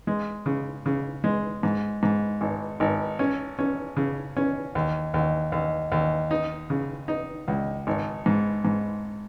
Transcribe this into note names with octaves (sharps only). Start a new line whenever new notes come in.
G#3
C#3
C#3
G#3
G#2
G#2
G#1
G#1
C#4
C#4
C#3
C#4
D#2
D#2
D#2
D#2
D#4
C#3
D#4
C#2
G#1
G#2
G#2